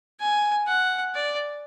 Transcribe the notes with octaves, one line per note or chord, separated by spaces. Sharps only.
G#5
F#5
D5